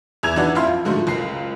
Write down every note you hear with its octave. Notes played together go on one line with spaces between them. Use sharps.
E2 E4 E6 G#6 F7
E3 D4 D#4 F#4 D5
A1 F2 E4 E5 F5 C6
F3
G#2 D3 F3 F#3 A3 D#4
F#1 C#2 C7